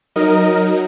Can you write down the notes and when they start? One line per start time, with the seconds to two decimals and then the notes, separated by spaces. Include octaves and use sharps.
0.16 F#3 D#4 A#4 D#5